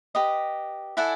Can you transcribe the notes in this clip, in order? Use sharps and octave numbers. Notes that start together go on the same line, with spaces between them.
G4 B4 D#5
E4 A4 D5 F#5 G#5